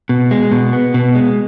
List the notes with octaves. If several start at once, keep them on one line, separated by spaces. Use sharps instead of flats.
B2
G#3
B2
B3
B2
G#3